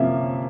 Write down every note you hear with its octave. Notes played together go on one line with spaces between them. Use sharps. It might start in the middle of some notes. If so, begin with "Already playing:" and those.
Already playing: C3 F3 A#3 C#4 E5